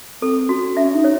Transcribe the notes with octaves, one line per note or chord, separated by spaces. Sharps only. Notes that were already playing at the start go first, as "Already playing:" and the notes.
C4 A4
C#4 F#4
C#4 E5
D#4
C#5